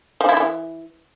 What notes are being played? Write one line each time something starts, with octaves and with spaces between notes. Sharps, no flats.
F3
E4
E3